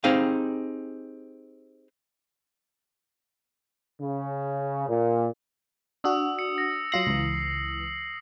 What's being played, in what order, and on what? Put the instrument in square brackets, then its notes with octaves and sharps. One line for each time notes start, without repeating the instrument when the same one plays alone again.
[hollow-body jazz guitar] C4 D#4 G4 G#4 F5
[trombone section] C#3
A#2
[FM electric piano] D4 F#4 [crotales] D#6 E6
[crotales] C#7
A#6
[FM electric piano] F#3 F4 A#6 [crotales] C7 F#7
[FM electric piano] C#2 E3